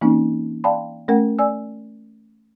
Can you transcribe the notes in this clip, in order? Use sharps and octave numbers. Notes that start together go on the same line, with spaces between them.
E3 A#3 C4 C#4 D#4
D5 F5 G5 A5 B5 C6
A3 C#4 A#4 F#5
D5 G#5 E6